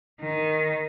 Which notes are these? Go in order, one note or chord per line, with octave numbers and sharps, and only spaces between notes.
D#3